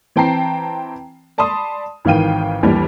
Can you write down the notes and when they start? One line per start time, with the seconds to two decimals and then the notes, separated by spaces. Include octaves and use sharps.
0.16 E3 C4 G5 A5 A#5 C7
1.38 D5 A5 B5 C6 D#6
2.05 G#1 D#3 E3 F5 G5 D#7
2.62 G1 D#2 E3 G3